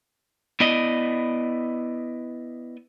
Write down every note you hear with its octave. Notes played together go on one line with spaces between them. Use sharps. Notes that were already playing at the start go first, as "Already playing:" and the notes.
B3 E4 D5 D#5